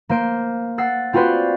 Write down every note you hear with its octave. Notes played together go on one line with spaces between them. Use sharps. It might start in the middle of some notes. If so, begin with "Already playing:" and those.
A#3 C5 D7
F#5 E6 A6 C7
C4 F4 F#4 B4 C5 D5